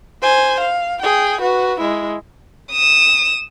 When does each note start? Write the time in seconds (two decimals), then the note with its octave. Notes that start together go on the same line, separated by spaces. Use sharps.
0.23 C5 G#5
0.61 F5
1.02 G#4 G5
1.41 F#4 B4
1.80 G#3 E4
2.72 D#6 E7